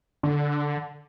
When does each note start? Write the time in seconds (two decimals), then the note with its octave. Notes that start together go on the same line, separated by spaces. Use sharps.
0.23 D3